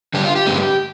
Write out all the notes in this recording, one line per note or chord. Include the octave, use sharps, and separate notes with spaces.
D3 G3 D4 G4
F4
G4
G2 D3 G#3 C4 D#4